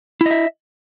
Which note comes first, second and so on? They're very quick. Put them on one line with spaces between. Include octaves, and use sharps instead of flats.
E4 D#5 E5